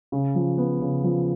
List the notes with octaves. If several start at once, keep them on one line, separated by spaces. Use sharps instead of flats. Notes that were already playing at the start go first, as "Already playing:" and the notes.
C#3
F3
B3
C#3
F3